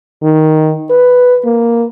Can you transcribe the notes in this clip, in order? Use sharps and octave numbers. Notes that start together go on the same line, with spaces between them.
D#3
B4
A#3